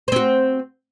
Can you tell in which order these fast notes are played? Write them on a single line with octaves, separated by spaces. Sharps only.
C5 C4 F#4